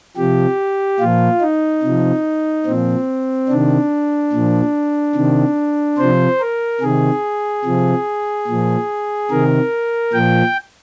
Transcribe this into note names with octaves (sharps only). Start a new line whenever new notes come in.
C3 F3 G4
A#2 F3 F4
D#4
C3 F3
A#2 F3 C4
C3 D#3 D4
A#2 F3
C3 D#3
C3 F3 C5
A#4
C3 D#3 G#4
C3 F3
A#2 F3
C3 D#3 A#4
A#2 F3 G5